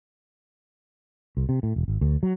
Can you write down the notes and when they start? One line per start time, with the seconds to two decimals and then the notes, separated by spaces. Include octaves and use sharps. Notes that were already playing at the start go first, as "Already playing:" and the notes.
1.37 C2
1.49 C3
1.63 A2
1.76 E1
1.88 G#1
2.01 D2
2.23 F#3